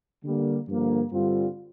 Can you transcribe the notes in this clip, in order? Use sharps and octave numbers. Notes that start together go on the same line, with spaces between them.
D3 G3 A#3
G2 D3 F3 A#3
G2 D3 G3 C4 F4